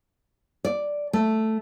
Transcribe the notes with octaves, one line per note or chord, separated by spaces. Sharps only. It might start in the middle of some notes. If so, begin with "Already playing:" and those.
D5
A3